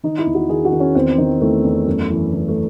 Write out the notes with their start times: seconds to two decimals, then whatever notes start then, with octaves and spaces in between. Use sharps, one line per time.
0.03 D#3 D#4
0.19 E4
0.26 E2
0.35 F#4
0.49 D#3 G#4
0.65 F#4
0.72 D#3
0.80 C#4
0.95 E2 C4
1.18 D#3
1.41 E2 A3
1.64 E2
1.86 F#2
2.10 E3
2.33 E3
2.48 A3